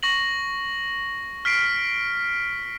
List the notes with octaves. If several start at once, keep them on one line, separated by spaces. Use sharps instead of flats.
C#6 A#6 F#7
F6 B6 C7 D7